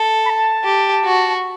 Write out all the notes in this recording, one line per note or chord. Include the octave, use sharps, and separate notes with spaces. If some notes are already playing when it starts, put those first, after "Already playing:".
Already playing: A4
B5
A5
G4
F#4